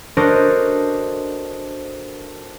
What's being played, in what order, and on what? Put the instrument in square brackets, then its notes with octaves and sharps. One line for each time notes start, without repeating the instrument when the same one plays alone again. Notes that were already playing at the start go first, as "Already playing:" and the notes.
[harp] D4 F#4 A4 A#4 C5 D#5